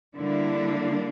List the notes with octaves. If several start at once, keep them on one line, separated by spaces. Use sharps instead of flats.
D3 G3 A#3 D4 E4